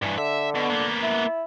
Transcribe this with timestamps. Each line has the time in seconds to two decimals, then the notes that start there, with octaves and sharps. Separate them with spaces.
0.02 G2 E3
0.18 D3 E5
0.55 B2
0.70 A#3 B3
1.03 E4